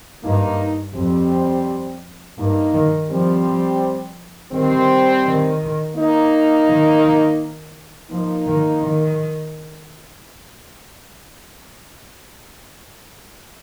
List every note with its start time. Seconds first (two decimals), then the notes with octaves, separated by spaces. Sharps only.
0.24 G2 A#3 D#4
0.95 F2 G3 C4
2.38 G2 A#3 D#4
2.74 D#3
3.10 F3 G3 C4
4.52 D#3 G3 C4
5.25 D#3
5.96 A#3 D#4
6.67 D#3
8.10 F3 A#3 D#4
8.47 D#3
8.82 D#3